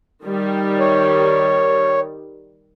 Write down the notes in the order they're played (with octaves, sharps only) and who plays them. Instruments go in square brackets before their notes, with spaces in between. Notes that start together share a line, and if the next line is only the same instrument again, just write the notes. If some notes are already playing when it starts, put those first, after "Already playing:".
[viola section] D#3 G3
[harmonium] C#5